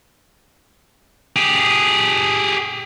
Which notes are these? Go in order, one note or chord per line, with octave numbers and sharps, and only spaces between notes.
G4 G#4